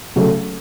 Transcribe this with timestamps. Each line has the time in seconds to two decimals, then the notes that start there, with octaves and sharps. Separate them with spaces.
0.16 C#3 F#3 A3